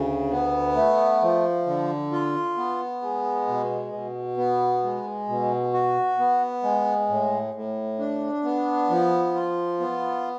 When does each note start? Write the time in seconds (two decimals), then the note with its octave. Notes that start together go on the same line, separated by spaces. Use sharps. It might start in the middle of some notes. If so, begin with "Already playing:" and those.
Already playing: D2 C#3
0.31 B3
0.76 A3
1.22 F3
1.67 D3
2.12 F4
2.57 B3
3.02 G#3
3.48 B2
3.93 B2
4.37 B3
4.84 G#3
5.29 B2
5.74 F#4
6.19 B3
6.63 G#3
7.09 A2
7.54 A2
7.99 D4
8.44 B3
8.90 F3
9.35 F4
9.80 B3